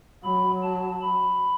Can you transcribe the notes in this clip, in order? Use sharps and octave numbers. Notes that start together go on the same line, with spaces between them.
F#3 B5
A5
B5